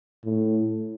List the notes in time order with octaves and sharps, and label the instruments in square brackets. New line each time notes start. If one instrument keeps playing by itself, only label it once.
[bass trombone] A2